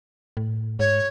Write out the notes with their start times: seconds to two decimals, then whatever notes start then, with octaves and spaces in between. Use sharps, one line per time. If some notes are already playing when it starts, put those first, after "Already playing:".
0.37 A2
0.79 G#2 C#5